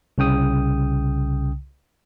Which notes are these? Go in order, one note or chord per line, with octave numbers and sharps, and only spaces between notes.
C2 C#3 G5 D#6